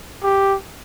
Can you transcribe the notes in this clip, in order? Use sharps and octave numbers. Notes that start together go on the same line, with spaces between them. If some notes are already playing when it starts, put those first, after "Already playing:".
G4